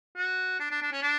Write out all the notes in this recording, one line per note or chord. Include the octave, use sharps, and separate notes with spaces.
F#4
D4
D4
D4
C#4
D4